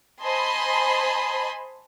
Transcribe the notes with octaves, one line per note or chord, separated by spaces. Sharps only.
C5 D#5 G#5 A5 B5 C6